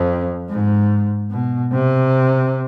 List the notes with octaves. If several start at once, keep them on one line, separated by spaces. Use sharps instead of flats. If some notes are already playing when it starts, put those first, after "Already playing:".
Already playing: F2
G#2
B2
C3